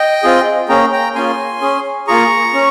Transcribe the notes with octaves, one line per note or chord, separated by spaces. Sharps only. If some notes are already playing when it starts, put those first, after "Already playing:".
Already playing: D#5 G5
C4 F4 G#4
A#3 C#4 G#4 G5 A#5
G5 A#5
A#3 C#4 F4 G#4 G#5 C6
C#4 G#4
A#3 F4 G#4 A#5 C#6
C#4